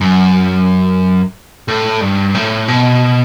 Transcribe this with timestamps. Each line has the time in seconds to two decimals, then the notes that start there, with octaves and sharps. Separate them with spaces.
0.01 F#2
1.68 A2
2.01 G2
2.35 A2
2.68 B2